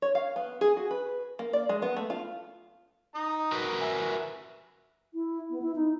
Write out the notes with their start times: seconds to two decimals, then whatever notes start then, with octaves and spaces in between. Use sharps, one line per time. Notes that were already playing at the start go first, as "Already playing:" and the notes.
0.02 C#5
0.15 F5
0.36 B3
0.61 G#4
0.77 F#4
0.91 B4
1.39 A#3
1.53 D5
1.69 G#3
1.82 B3
1.96 A3
2.10 F4
3.15 D#4 A#5 D#6
3.52 F#4 A#4 B4
3.81 E5 G#5
5.13 E4
5.50 B3
5.62 E4
5.75 D#4